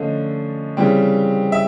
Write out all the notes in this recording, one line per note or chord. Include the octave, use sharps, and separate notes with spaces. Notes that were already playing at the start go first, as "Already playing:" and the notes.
Already playing: D3 F3 A3 C#4 D#5
C#3 E3 G3 C4
E5